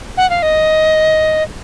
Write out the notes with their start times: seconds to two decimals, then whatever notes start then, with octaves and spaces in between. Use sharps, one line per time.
0.17 F#5
0.30 F5
0.42 D#5